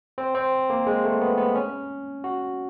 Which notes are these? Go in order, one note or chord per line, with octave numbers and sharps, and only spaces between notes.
C4
C4
A#3
G#3
A3
B3
B3
C#4
F#4